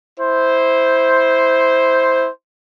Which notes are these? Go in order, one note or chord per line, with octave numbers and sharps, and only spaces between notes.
E4 C5